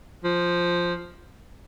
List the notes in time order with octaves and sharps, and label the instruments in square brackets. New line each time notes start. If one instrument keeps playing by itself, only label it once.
[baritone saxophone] F3